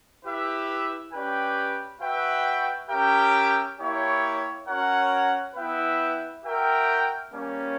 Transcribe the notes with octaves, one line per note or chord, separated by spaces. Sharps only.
E4 G4 B4 E5
C#4 G4 B4 D5 G5
F#4 B4 E5 G5
C#4 G4 A#4 E5 G5
A#3 E4 G4 C#5
C#4 F#4 A#4 C#5 F#5
B3 E4 B4 E5 G5
F#4 A#4 E5 G5
G3 A#3 C#4